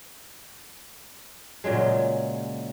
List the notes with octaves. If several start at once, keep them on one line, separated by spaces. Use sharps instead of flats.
A#2 C#3 F#3 G#3